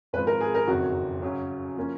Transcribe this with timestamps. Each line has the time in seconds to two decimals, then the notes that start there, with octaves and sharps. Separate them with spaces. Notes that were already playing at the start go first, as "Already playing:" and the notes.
0.13 G#1 G#2 F3 B4
0.27 A#4
0.41 G#4
0.55 A#4
0.68 F#1 F2 D#3 F#3 F#4
1.22 F#2 C#3 F#3 C#4
1.77 F3 A#3 C#4